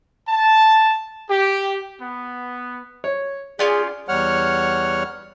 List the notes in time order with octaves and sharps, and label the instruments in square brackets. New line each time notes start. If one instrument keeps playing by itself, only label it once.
[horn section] A5
G4
B3
[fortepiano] C#5
[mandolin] C#4 F4 G4 [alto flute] G#4 [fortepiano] D5
[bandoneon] E2 G3 C#5 F#5 F6